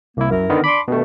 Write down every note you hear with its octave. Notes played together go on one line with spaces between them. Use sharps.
C2 A#3 E4
F#2 E4 A#4
D3 D#3 B3
D4 B5 C6 D6
G2 B2 D#3 A3